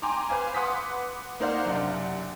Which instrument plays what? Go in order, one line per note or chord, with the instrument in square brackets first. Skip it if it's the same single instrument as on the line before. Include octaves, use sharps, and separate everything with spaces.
[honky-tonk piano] G5 G#5 A#5 C6 D6
B4 C5 F5 G#5
B4 F#5 C6 D6 D#6 B6
A#3 D#4 C5 D5 F5 F#5
F#1 C3 D4 F#5